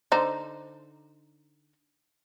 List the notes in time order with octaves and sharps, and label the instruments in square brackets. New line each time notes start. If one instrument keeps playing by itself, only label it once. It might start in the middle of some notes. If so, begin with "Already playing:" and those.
[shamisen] D3 D#4 C5